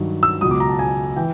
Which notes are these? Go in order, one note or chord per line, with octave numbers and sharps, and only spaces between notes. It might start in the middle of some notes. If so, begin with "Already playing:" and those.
Already playing: G2 D#3 F#3
E6
C#2 B2 F#3 D#6
D6
A#5
A5
G#5
E3 G5